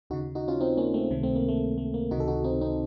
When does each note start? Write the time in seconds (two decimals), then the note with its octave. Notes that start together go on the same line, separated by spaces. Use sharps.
0.10 D#2 C#3 D#4 F#4
0.35 D#4 F#4
0.48 C#4 F4
0.60 C4 D#4
0.77 A#3 C#4
0.94 A3 C4
1.10 C#2 C3 D#3 A3
1.23 A3 C4
1.35 A#3
1.48 A3
1.78 A3
1.94 A#3
2.11 C#2 C3 D#3 D#4 F#4
2.20 A4
2.28 D#4 F#4
2.44 C4 D#4
2.61 C4 D#4